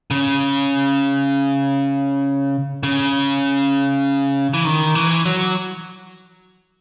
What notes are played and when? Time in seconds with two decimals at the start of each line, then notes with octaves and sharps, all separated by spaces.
0.11 C#3
2.83 C#3
4.54 E3
4.65 D#3
4.95 E3
5.26 F#3